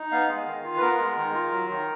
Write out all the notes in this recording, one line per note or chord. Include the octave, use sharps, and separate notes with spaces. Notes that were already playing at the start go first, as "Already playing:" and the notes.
Already playing: D#4
B3 F5
G#3
D#3
F4
B4
B3 A#4
G#3
D#3
F4
F#3
D#3